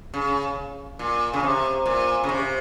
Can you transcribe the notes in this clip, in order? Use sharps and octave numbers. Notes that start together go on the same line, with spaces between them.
C#3
A#2
C#3
C3
A#2
C#3
C3